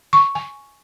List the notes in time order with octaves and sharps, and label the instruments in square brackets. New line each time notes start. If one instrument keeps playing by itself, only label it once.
[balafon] C#6
G#5